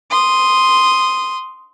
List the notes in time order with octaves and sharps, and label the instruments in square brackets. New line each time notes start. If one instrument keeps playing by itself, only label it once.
[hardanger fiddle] C6 D#6